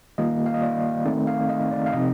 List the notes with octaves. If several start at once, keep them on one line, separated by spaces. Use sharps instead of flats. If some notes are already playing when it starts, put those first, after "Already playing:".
D#3 G3 A#3 F4 D#5
F5
D#5
D5
D#3 A3 C4 D#4 D5
F5
D#5
D5
F5
C3 F3 C4 D#4 D#5